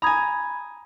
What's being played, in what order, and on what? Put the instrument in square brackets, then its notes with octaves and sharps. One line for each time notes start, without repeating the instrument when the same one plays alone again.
[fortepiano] G#5 A#5 [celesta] B5 D#6 G#6